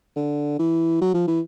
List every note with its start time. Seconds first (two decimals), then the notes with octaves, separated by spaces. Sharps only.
0.16 D3
0.59 E3
1.01 F#3
1.14 F3
1.27 E3